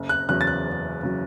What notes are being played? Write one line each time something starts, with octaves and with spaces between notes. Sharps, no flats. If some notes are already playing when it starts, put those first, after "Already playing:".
Already playing: F#1
F#6
E2 C#3 F#3 F#6
A6
F#6
F#1
C#3 F#3